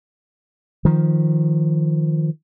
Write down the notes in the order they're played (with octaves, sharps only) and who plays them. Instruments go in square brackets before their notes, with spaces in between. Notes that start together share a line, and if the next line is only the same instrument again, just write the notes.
[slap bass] D#3 F3